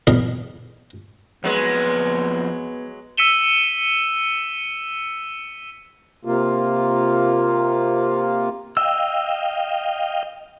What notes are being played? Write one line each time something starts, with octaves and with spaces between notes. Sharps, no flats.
B1 E2 D#4 A#4
F2 F#3 G#3 B3 B4
E6 B6 C#7 D#7 E7 G7
C3 A#3 F4
D#5 F5 G5 E6